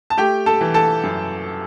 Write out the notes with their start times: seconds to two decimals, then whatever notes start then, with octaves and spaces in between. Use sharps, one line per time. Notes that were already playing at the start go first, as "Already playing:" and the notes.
0.10 A5
0.18 A3 G4 G5
0.46 A4 A5
0.61 E3
0.74 A4 A5
1.03 F#2